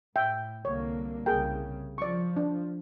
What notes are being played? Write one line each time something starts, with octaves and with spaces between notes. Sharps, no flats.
A2 E5 G5
C2 D3 A#3 C#5
C2 C#3 G#4 A#4 G5
F3 D5 C#6
D4